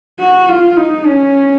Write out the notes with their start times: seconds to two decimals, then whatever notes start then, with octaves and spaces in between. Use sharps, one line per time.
0.20 F#4
0.48 F4
0.77 D#4
1.06 C#4